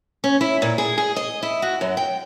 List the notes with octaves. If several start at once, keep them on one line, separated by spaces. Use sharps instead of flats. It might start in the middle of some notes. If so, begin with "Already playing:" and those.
C#4
E4
A#2
G#4
G#4
D#5
E4
F#4
F#2
G5